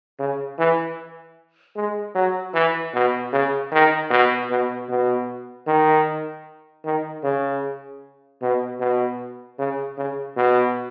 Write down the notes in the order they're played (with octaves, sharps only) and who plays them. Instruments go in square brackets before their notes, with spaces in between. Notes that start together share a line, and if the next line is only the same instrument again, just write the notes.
[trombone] C#3
E3
G#3
F#3
E3
B2
C#3
D#3
B2
B2
B2
D#3
D#3
C#3
B2
B2
C#3
C#3
B2